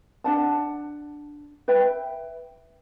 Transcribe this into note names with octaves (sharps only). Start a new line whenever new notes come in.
D4 F#5 A5
B4 E5 G5